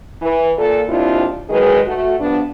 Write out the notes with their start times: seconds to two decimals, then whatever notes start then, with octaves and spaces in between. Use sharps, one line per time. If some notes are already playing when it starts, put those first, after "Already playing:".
0.21 E3
0.57 A#2 A4
0.89 D#2 C4 D4 E4 F4
1.49 D#3 F#3 G#3 G#4 B4
1.86 A3 F#4
2.19 G2 F3 B3 D4